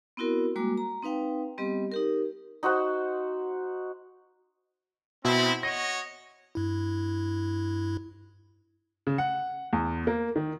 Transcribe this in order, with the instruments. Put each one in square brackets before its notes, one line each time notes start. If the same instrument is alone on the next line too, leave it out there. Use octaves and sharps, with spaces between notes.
[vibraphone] B3 C4 E4 F#4 A#4
G3 G#3 A#3 F#4 D6
A#5
C4 D#4 B4 F5 G5
G3 B3 C4 G4 D#5
D#4 G4 A#4
[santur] D#4 F#4 C5 F#5
[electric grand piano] B2 [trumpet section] C4 E4
[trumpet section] F#4 C#5 D#5 [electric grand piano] A#6
[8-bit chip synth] G2 E4
[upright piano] C#3
F#5
E2
A#3
D#3